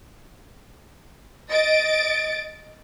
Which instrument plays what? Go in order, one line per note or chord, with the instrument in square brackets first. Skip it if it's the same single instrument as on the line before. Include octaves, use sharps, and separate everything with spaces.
[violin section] D#5 A6 D7